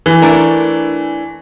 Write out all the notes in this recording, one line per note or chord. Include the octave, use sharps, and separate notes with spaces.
E3
A3 D4 A#4